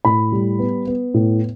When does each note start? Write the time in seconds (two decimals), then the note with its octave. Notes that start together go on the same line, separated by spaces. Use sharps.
0.05 A2 B5
0.32 G3
0.59 B3
0.87 B3
1.14 A2